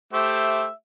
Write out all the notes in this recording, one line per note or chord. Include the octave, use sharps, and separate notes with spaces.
A3 G4 C5 E5